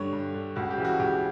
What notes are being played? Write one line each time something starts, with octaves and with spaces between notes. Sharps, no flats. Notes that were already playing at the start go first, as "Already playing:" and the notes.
Already playing: G2 D3 C#5
G2
D3
C#2 F#4
G4
C#3 E3
F#4
C#2 G4